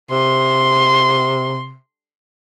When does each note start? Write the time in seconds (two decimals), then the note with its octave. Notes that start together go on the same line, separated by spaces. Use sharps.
0.11 C3 C6